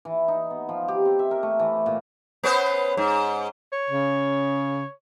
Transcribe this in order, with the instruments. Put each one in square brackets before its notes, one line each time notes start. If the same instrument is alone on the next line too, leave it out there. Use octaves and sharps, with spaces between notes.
[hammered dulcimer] E3
D#4
B3
F3
G4
C4
E5
A#4
A3
E3
A#2
[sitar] B3 C#4 C5
G#2
[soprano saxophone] C#5
[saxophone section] C#3